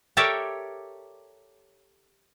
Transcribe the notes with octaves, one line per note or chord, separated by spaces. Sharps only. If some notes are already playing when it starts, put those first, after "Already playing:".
G4 A4 A#4 C#5 D5 E5